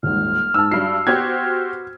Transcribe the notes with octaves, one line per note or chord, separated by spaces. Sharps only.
D#1 G#1 F6
G#2 A5 E6
G2 F#4 F6 C7
B3 F#4 G4 C5 F6 G#6